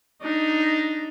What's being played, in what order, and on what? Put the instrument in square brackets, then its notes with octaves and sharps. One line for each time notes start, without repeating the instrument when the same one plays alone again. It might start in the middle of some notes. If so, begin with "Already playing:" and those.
[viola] D4 D#4